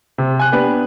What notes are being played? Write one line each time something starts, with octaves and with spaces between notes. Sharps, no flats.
C3
G#5 F#6
B3 D4 G4 B4